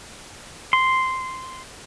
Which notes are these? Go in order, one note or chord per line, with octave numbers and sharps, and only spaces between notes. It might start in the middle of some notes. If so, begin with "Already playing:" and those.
C6